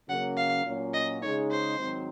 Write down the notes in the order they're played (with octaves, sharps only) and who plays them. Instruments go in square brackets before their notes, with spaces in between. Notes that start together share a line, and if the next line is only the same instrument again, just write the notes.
[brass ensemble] C#3 F#3 A#3 C#4 [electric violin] F#5
[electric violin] F5
[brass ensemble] A#2 F#3 C#4
[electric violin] D#5
[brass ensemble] C#3 G#3 D#4 [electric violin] C#5
[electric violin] C5
[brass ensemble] G#2 D#3 F#3 C4